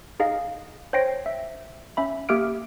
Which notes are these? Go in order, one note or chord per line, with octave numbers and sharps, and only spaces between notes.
D#4 G#4 D#5 F5
C5 C#5 G5 A#6 C7 D7
E5
C#4 E5 B5
A#3 G4 E5 F6 D7